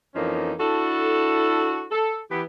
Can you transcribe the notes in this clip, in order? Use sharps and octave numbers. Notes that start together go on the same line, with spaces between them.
F2 E3 F3 A#3 C#4 D#4
D4 E4 F#4 A4
A4
E3 B3 G4